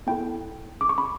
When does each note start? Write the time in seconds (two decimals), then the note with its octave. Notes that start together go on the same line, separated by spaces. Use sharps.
0.07 B3 E4 A4 G5
0.81 D6
0.89 C#6
0.98 B5